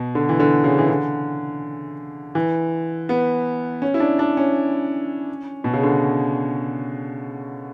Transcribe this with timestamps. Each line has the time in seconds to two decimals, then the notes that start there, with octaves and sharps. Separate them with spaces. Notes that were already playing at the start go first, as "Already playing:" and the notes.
Already playing: B2
0.15 D3
0.29 E3
0.40 D3
0.64 C#3
0.78 E3
0.89 D3
2.35 E3
3.09 B3
3.82 C#4
3.94 E4
4.00 D4
4.19 D4
4.37 C#4
5.64 B2
5.73 C#3
5.83 D3